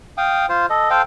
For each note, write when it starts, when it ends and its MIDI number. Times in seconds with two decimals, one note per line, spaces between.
0.18 0.46 77
0.18 0.46 79
0.18 0.46 87
0.49 0.66 65
0.49 0.66 72
0.70 0.90 69
0.70 0.90 75
0.90 1.02 69
0.90 1.02 72
0.90 1.02 77
0.90 1.02 79